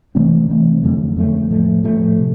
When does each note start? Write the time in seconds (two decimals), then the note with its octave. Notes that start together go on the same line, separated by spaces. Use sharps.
0.15 C3 E3 A3 C4
0.48 C3 E3 A3 C4
0.82 F2 D3 F#3 A3
1.16 F2 D3 F#3 A3
1.50 A2 F3 A3
1.84 A2 F3 A3
2.19 C3